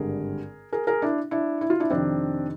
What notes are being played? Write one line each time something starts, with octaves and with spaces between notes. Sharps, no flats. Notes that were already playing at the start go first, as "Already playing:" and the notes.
Already playing: G#1 G2 D3 G3 G#4 A#4
G#4 A#4
G#4 A#4
D4 E4
D4 E4
E4
F4
D4 E4
F2 C3 D#3 C4 D4